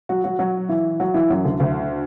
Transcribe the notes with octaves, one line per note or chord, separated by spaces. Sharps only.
F#3 F#4
F#3 F#4
F#3 F#4
E3 E4
F#3 F#4
E3 E4
F#2 F#3
D2 D3
D2 D3